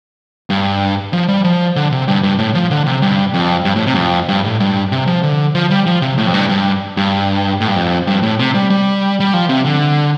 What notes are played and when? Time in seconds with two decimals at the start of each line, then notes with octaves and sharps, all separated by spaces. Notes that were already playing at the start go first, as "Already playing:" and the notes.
0.50 G2
1.13 F3
1.29 G3
1.44 F3
1.76 D3
1.92 C3
2.08 G2
2.23 G2
2.39 A2
2.55 F3
2.71 D3
2.86 C3
3.02 G2
3.34 F2
3.65 G2
3.76 A2
3.86 C3
3.93 G2
3.97 F2
4.28 G2
4.45 A2
4.60 G2
4.92 C3
5.07 F3
5.23 D3
5.55 F3
5.71 G3
5.86 F3
6.02 C3
6.18 A2
6.27 F2
6.34 G2
6.49 G2
6.97 G2
7.60 A2
7.68 G2
7.76 F2
8.07 G2
8.23 A2
8.39 C3
8.55 G3
8.70 G3
9.20 G3
9.34 F3
9.49 C3
9.65 D3